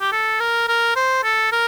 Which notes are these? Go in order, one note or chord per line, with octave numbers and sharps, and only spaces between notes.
G4
A4
A#4
A#4
C5
A4
A#4